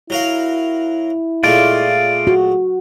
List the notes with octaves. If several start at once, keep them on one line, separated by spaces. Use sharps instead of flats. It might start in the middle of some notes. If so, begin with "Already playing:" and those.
F#3 E4 A#4 F5
A#2 G#3 A3 F4 D5
F#4